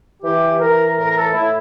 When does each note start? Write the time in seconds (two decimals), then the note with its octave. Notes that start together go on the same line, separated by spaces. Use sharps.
0.23 E3 G4
0.60 E3 A#4
0.97 A2 A#4
1.08 A#4
1.16 A4
1.33 A2 E4